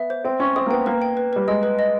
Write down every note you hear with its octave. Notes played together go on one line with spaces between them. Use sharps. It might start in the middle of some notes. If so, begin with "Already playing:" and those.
Already playing: B3 E5
C5
C4 G5
C#4 C6
C4 D#6
A#3
B3 G5
A#3 B4
G5
B4
G3 B4
G#3 D#5
B4
D#5